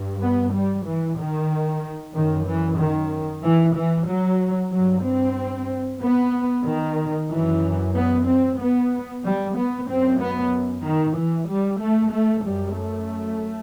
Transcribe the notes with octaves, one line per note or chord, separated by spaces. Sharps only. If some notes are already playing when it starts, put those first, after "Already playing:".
Already playing: G2
B3
G3
E3
D#3
F#2 D#3
E3
D#3
E3
E3
F#3
G2 F#3
C4
B3
D#3
F#2 E3
B3
C4
B3
G3
B3
F#2 C4
B3
D#3
E3
G3
A3
A3
F#2 G3
A3